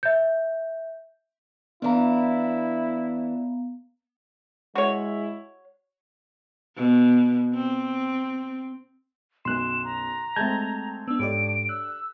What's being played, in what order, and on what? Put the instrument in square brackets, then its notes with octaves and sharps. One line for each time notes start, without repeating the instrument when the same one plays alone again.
[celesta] E5 G6
[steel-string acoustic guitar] E3 D4 [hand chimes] B3 F5 A#5 [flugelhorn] E4
[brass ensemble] G#3 E4 [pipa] F#4 C#5
[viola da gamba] B2
C4
[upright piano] B1 F#2 [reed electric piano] C6 F#6 [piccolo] E7
[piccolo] A#5
[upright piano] G#3 A3 C4 [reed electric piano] A5 G6 G#6
[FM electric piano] B3 D4 [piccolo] E6
[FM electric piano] G#2 C#5 D5 [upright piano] D4 G4 A4 [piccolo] D7
[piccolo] E6 [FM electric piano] F#6